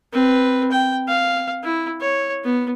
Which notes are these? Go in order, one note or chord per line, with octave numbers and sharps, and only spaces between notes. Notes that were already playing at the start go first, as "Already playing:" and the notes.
C4 B4
G5
F5
E4
C#5
B3